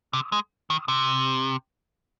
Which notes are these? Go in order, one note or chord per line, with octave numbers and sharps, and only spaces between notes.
C3
G#3
D#3
C3